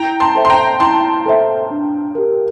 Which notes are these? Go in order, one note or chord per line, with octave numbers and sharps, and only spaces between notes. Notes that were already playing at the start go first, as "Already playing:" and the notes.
Already playing: E4 G5 A#5
A5 C6
A4 C5 E5
C6
G5 A#5
E4 A5 C6
A4 C5 E5
D4
G4 A#4